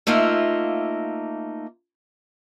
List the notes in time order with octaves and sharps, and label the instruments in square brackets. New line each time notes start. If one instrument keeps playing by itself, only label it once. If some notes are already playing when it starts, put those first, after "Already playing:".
[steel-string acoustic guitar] A3 A#3 D#4 F4 E5